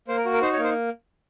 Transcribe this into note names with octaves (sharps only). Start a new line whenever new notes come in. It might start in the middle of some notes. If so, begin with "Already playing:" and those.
A#3 C5
A#4
F#4
A#4
D#4 C5
C#5
A#3
C5